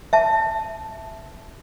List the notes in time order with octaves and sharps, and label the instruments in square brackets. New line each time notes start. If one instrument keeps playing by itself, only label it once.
[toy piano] E5 A5